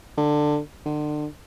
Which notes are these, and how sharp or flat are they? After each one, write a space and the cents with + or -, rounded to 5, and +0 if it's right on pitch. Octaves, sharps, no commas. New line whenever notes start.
D3 +15
D3 +35